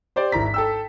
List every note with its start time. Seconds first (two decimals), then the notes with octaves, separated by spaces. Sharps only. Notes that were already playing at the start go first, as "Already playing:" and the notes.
0.16 G4 C5 D5
0.32 G#1 E4 A#5 B6
0.54 A4 G5 E6